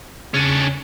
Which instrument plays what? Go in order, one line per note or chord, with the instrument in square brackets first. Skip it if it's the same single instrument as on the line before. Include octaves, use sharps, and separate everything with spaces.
[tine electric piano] E2 C#3 [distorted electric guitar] C#4 D4